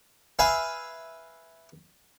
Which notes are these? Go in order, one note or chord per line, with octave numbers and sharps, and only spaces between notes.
B4 E5 F5 G#5